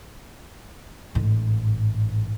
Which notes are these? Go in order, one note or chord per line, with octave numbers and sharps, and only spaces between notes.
A1 G#2